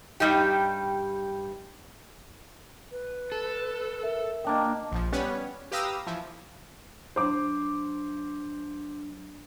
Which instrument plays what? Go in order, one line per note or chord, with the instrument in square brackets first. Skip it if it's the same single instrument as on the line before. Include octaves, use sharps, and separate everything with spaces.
[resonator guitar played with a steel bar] G2 A#2 G3 D#4 G4
[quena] B4
[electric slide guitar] A4
[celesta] A#4 E5
[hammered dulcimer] A#3 D4 D#5 [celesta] G5
[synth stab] A#1 F3
G3 B3 C#4 B4 C#5
G4 B4 F5 A#5 D#6 E6
E3 F3
[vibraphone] F#3 D4 [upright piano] C5 D6